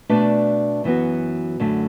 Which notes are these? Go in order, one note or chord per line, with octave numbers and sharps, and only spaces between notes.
B2 A3 D4 B4 D5
F#2 E3 B3 F#4
F#2 D3 A3